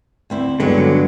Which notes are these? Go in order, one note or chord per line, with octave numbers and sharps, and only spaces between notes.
D2 C4 E4
G2 D3 F#3 G#3 B3